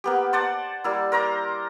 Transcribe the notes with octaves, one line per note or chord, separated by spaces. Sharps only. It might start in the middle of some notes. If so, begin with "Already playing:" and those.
A#3 B3 G4
C5 D5 F#5 A5
G3 A#3 E4
A#4 C5 A#5 D6